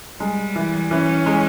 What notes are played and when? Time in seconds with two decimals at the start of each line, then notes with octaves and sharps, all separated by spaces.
0.20 G3 G#3
0.56 E3
0.91 E3 C#4
1.26 G#3